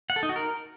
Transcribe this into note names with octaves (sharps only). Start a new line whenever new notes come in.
F#5
A4
D#4
F#4
A#4